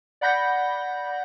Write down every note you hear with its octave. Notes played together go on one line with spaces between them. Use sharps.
D5 F#5 B5 G6 A#6